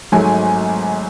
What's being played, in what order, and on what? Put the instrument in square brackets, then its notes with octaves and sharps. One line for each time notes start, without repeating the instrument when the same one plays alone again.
[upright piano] G#1 G#2 F#3 A3 G#5